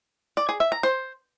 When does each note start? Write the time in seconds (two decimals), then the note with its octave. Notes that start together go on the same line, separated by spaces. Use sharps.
0.37 D5
0.49 G#4
0.60 E5
0.72 A#5
0.83 C5